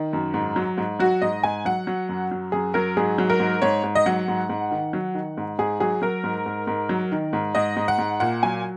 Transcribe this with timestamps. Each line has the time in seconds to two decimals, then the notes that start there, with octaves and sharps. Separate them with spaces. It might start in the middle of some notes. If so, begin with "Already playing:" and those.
Already playing: D#3
0.13 F#2
0.34 G#2
0.56 F#3
0.78 G#2
1.00 F#3 F#4
1.22 G#2 D#5
1.43 G#2 G#5
1.65 F#3 F#5
1.87 F#3
2.09 F#2
2.31 F#3
2.52 F#2 G#4
2.74 F#3 A#4
2.97 G#2 G#4
3.18 F#3
3.30 A#4
3.40 G#2
3.62 G#2 C#5
3.84 G#2
3.95 D#5
4.06 F#3 F#5
4.28 G#2
4.49 G#2
4.71 D#3
4.93 F#3
5.15 D#3
5.37 G#2
5.58 G#2 G#4
5.80 F#3 G#4
6.02 F#3 A#4
6.24 G#2
6.46 G#2
6.67 G#2
6.89 F#3
7.12 D#3
7.33 G#2
7.55 G#2 D#5
7.76 G#2
7.88 F#5
7.98 G#2
8.20 A#2 F#5
8.43 F#3 G#5